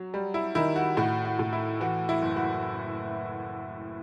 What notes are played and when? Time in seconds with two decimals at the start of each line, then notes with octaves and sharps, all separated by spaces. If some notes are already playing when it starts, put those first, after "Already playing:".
Already playing: F#3
0.14 G3
0.34 E4
0.55 D#3 E4
0.76 F#4
0.97 A2 F#4
1.25 F#4
1.39 A2
1.53 E4
1.80 E3 F#4
2.09 E4
2.22 F#1
2.36 F#4